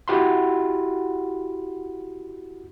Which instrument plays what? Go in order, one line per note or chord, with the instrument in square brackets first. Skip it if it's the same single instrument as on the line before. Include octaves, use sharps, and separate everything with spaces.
[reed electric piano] E4 F#4 G4 F#5 B5 C6